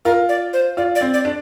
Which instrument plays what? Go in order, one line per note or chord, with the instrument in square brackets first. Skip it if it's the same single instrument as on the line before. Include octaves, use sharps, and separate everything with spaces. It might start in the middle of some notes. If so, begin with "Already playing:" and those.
[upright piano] F4 [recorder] A#4
[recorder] D5
C5
[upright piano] F4 [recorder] D5
[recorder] D5
[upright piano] C4
[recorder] D5
[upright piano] D4